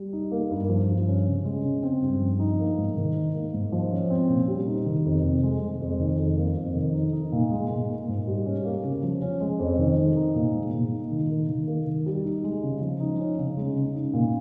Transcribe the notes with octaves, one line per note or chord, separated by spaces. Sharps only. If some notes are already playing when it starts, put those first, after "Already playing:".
Already playing: G3
D#4
A#3
G2
F3
G2
C#4
C#3
G#3
C#3
C4
G2
F3
D#4
A#3
G#2
D#3
D#4
A#3
G#2
F3
C#4
C4
A#2
G3
D#4
D#3
F2
C3
G#3
G#3
F2
D#3
F2
A#3
F2
D#3
D#4
D#4
A#2
G#3
A#2
A#3
G#2
G3
C#4
A#3
C#3
F3
C#4
G#3
F2
D#3
D#4
D#4
A#2
G#3
A#2
D#4
D#3
A#3
D#3
A#3
D#3
G3
D#4
G#3
C#3
F3
D#4
C#4
C#3
G#3
C#3
D#4
A#2